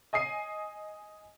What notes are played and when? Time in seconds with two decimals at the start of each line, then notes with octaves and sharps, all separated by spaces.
0.13 D#5 G#5 D#6 C7 D#7